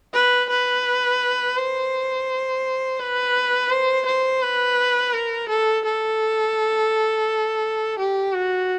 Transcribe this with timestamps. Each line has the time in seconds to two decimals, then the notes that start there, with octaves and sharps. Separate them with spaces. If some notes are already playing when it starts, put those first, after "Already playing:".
0.14 B4
0.50 B4
1.57 C5
2.99 B4
3.71 C5
4.06 C5
4.42 B4
5.13 A#4
5.49 A4
5.85 A4
7.99 G4
8.34 F#4